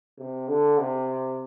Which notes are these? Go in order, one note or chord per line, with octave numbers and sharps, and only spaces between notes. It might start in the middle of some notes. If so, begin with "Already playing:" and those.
C3
D3
C3